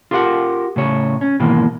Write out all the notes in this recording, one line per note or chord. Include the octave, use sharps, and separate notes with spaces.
F4 G4 A#4 E5 F#5
A2 C#3 C#5
C#4
G#2 B2 D#3 E3 G#3 A#3